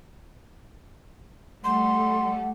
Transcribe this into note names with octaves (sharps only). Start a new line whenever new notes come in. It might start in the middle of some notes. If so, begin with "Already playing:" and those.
G3 A3 A4 F#5 C6